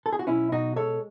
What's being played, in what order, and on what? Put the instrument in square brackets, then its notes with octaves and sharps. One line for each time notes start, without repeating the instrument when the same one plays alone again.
[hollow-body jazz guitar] A4
G#4
F#4
B1 C#4 E4
B2 D#4 F#4
G#3 A4 C#5